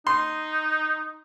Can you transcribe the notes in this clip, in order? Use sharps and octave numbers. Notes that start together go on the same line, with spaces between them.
D#4 C6